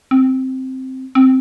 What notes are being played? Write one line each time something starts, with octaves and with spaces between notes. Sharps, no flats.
C4
C4